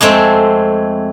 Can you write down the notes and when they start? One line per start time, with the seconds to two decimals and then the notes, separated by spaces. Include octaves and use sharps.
0.01 F2 G#3 A3 C4